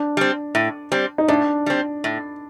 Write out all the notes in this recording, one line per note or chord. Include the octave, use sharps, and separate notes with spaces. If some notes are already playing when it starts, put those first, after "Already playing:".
Already playing: D4
G3 C4
A2
G3 C4
D#4
A2 D4
G3 C4
A2